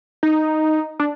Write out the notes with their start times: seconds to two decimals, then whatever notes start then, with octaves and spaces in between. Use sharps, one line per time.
0.23 D#4
1.00 D4